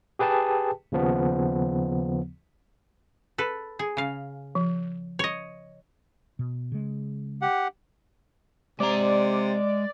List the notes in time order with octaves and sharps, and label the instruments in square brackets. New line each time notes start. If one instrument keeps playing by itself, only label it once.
[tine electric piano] G4 G#4 B4 G5 A5
D#2 C#3 F3 B3
[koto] A4 B4
G#4
C#3 F5
[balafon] F3
[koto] C#5 D#5
[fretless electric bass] B2
C#3 G#3
[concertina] G4 F#5
[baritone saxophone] C3 [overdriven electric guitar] G#3 A#5 [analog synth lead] D5